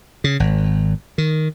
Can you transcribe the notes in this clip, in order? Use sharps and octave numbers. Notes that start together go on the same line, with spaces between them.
C#3
G#1
D#3